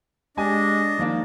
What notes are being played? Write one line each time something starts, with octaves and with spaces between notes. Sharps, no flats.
G#3 D4 G4 D#5 G#5
D#3 F3 A#3